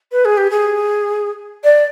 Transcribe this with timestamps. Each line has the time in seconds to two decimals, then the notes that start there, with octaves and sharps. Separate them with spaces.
0.12 B4
0.25 G#4
0.37 G4
0.50 G#4
1.63 D5